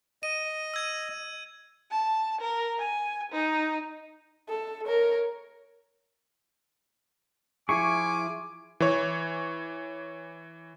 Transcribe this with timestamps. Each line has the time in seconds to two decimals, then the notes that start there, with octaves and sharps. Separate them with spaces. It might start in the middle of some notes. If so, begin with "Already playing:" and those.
0.23 D#5 D#7
0.74 E6 G#6 D#7
1.91 A5
2.41 A#4
2.79 G#5
3.32 D#4
4.48 A4
4.85 A#4 C#5
7.69 F3 E4 G#4 G#5 C#6 D6
8.80 E3 C#5